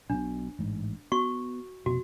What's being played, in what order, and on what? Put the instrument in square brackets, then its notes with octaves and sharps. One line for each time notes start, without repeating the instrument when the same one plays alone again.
[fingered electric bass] B1 B2 [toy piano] D4
[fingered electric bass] A1 G#2
[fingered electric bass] B3 [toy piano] F#4 C#6
[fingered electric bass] F1 B2 B3 [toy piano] F#4